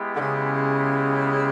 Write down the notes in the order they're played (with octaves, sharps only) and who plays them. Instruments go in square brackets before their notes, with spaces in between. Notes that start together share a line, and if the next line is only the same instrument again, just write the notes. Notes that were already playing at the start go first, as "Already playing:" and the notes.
Already playing: [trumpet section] G#3 B3 E4 G4
[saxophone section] D3
C#3